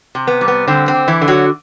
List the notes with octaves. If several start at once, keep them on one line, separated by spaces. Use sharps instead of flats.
C3
B3
G3
B3
D3 C4
C4
D3
E3 E4
D3
F#3 F#4